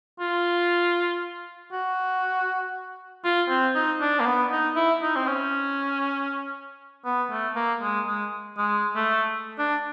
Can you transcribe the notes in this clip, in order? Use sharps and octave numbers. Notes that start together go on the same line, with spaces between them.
F4
F#4
F4
C4
D#4
D4
A#3
B3
D#4
E4
D#4
C4
C#4
B3
A3
A#3
G#3
G#3
G#3
A3
D4